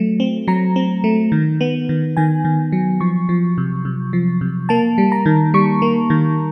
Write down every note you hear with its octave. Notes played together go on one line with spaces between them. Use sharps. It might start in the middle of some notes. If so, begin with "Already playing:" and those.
Already playing: F#3 A3
C4
F#3 A#5
C4
A3
D#3
B3
D#3
D#3 G#5
D#3
F#3
F3 C#6
F3
C3
C3
F3
C3
A#3 A5
G3
A#5
D#3
G3 C#6
A#3
D#3